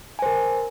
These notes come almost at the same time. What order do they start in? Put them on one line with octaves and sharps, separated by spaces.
G#5 C5 A#4